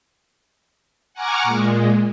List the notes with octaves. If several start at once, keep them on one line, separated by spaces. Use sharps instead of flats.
F#5 G#5 A#5 C#6 D6 F6
A#2 G#3